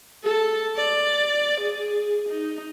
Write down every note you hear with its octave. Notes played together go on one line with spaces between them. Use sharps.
A4
D5
G#4
D#4